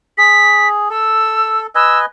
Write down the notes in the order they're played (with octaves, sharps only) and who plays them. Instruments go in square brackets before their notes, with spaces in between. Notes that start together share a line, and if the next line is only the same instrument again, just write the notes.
[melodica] G#4 [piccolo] B6
[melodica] A4 [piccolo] E6
[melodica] B4 D#5 G#5 [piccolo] E6